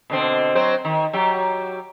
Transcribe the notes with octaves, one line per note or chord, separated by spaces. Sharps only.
B2 D3 C4
F#3 C4 C5
D#3
F#3 G4